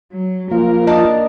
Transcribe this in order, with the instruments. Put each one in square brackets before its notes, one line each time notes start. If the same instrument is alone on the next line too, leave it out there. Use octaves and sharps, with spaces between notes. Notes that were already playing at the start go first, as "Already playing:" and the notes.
[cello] F#3
[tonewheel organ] F3 F4 [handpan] A#3 [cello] A#4
[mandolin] D4 A5 [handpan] D#5